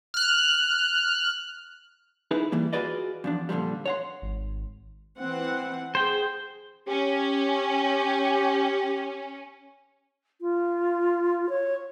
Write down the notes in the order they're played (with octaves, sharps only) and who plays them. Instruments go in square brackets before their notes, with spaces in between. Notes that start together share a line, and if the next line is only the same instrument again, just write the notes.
[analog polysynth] F6 F#6
[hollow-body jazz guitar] D#4 E4 G#4 B4
E3 G3 A#3
F4 F#4 G#4 B4 D5 D#5
E2 F3 D4
A#2 D3 E3 F3 G3
C#5 F#5 C6
[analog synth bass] G#1
[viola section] E3 C4 F#5
[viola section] G#4 [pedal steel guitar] C5 G5
[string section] C#4 [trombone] G4
[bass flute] F4
C#5